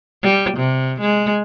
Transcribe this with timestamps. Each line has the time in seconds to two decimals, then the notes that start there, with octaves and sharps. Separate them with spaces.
0.23 G3
0.57 C3
1.00 G#3